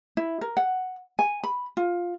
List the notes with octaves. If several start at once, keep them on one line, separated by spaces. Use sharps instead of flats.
E4
A#4
F#5
G#5
B5
F4